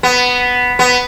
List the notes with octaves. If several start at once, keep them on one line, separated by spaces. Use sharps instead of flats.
B3
B3